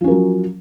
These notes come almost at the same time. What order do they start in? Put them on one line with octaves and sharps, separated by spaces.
F3 C#4 A#4 F#3